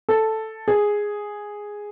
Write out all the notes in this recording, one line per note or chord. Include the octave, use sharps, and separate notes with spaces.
A4
G#4